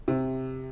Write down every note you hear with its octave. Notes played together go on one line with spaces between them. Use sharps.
C3